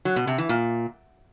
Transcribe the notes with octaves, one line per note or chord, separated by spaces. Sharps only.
F#3
B2
C3
E3
A#2